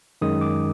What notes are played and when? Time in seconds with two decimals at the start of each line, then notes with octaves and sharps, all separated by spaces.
0.21 F#2 D#3 G#3 D#6
0.41 D6